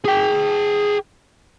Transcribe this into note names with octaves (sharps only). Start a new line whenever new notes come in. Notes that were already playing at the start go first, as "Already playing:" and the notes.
G#4 G5